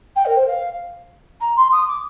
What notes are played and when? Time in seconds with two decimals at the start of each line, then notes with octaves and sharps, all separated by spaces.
0.15 G5
0.25 A#4
0.36 C5
0.47 F5
1.40 A#5
1.56 C6
1.72 D#6
1.87 D6